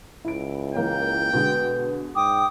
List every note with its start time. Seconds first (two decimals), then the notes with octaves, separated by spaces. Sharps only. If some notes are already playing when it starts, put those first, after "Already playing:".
0.25 C#2 E4 D7
0.75 E3 A#3 C#4 G5
1.33 B2 D3 G#3 B4
2.16 G#2 G5 D6 D#6